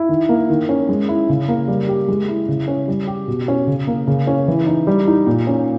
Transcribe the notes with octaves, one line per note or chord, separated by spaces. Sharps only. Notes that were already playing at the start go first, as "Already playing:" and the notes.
Already playing: E4
D#3
A#3
D#3
C#4
G#3
E4
C#3
A#3
G3
G4
G#3
E4
C#3
C#4
G3
G4
B2
C#4
C#3
A#3
C#3
C#4
E3
D#4
G3
D#4
A#2
C#4